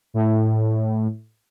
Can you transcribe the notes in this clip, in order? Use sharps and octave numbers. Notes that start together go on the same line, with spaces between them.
A2